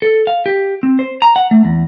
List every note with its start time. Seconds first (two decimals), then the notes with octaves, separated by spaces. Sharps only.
0.02 A4
0.27 F5
0.46 G4
0.83 C4
0.99 C5
1.22 A#5
1.36 F#5
1.51 A3
1.65 E2